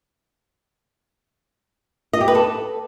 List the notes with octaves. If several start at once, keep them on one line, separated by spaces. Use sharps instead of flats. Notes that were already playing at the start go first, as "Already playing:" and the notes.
D#5
G4
B4
A4